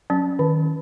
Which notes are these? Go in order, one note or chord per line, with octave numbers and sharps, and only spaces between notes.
F#3 C#4
D#3